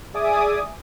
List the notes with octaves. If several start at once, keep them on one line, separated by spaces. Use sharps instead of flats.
G#4 D5 E5 G#5 D6 D#6